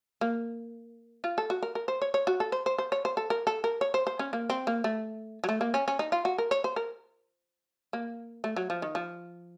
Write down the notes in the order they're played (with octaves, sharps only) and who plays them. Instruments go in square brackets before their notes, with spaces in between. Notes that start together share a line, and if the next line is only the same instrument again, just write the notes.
[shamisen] A#3
F4
A4
F#4
A#4
A#4
C5
C#5
C#5
F#4
A4
C5
C5
C5
C#5
C5
A4
A#4
A4
A#4
C#5
C5
C5
C#4
A#3
C4
A#3
A3
F#3
A3
A#3
C#4
C#4
D#4
F4
F#4
A#4
C#5
C5
A#4
A#3
A3
F#3
F3
D#3
F3